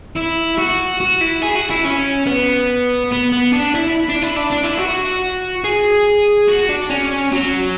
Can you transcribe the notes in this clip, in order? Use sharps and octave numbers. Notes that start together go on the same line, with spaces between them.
E4
F#4
F#4
E4
G#4
F#4
E4
C#4
B3
B3
B3
D4
E4
D4
E4
D4
D4
E4
F#4
G#4
F#4
D4
C#4
F#3